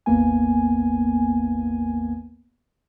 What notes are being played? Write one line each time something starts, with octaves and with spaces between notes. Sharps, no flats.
G#1 D#2 A#3 B3 G#5